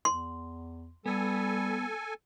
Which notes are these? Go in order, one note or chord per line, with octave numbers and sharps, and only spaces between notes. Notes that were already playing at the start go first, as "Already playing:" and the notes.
E2 C6
G3 B3 A4 G#5